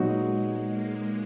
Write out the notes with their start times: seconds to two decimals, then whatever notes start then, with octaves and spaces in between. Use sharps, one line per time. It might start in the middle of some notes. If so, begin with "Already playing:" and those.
Already playing: A#2 F#3 G#3 B3 D#4 F#4
0.67 A#3